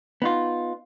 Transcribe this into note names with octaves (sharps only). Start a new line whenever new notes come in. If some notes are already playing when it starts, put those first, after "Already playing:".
B3 D#4 F4